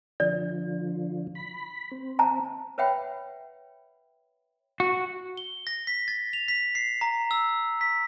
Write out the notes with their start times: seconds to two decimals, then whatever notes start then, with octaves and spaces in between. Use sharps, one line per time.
0.20 D3 F3 D5
1.35 B5
1.92 C4
2.19 A5 A#5
2.78 B4 C#5 E5 F#5 G5 B5
4.80 F#4
5.38 G7
5.67 A#6
5.87 B6
6.08 A6
6.33 F7
6.48 B6
6.75 C7
7.01 A#5
7.31 E6
7.81 B6